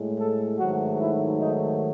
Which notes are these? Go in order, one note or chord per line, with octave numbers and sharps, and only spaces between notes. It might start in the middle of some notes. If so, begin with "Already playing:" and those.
Already playing: A2 G#3
A4
G#2 D#3 F#3 A3 F#4
E4
D#4